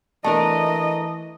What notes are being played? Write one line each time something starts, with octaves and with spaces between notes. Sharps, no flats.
E3 A3 D4 A#4 D#5 A5